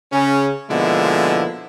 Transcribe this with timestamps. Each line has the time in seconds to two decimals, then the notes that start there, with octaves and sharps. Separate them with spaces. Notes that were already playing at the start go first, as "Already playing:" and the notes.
0.13 C#3 C#4
0.70 B2 D3 F3 G#3 A#3 E4